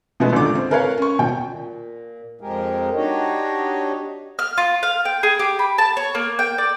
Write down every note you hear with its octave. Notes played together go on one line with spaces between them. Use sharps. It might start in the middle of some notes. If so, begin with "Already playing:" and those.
B2 F3 G#3 A3 B3
G#1 C#2 A#2 D3 D6
C4
A#4 B4 C#5 F5
C#4 C#6
D#1 B2 G5
A#2
F2 F3 G#3 G4 G#4 A#4
D4 D#4 F#4 G4 C#5 D#5
F6
F4
F5
G5
G#4
G4
B5
A5
C#5
A#3
G5
D5